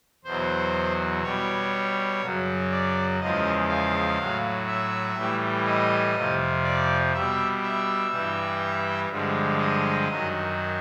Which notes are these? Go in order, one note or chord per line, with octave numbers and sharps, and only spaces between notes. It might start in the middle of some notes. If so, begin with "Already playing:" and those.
E2 B2 F#3 C5
B2 G3 C#5
F#2 C#3 F#3
D5
E2 C#3 F3 G#3 D#5
F5
A2 F#3
E5
A2 E3 G3
D#5
F2 C3 F3
D5
B2 G3 E5
E5
G2 E3 G3
G2 D3 F3 G#3
D#5
F#2 D#3 F#3